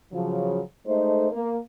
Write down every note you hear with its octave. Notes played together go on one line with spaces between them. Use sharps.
C#3 F3 F#3
G#3 A3 D#4 A4 C5
A#3